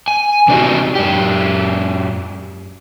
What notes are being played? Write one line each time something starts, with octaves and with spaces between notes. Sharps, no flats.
G#5
E2 C3 D4 D#4 F#4 G4
F#2 G4